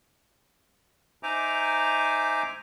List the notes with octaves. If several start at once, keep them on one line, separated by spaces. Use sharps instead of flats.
D#4 C5 E5 G#5 A#5 D6